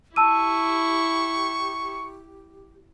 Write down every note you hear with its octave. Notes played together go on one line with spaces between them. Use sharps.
E4 G4 A5 C#6 E6 D#7